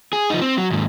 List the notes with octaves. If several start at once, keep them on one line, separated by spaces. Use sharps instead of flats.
G#4
F3 D#4
C4
F#3
D#2 G#2